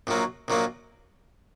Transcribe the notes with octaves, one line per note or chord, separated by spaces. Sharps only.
A#1 A#2 F#3 A#3
A#1 A#2 F#3 A#3